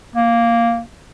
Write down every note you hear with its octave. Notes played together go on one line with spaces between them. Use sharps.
A#3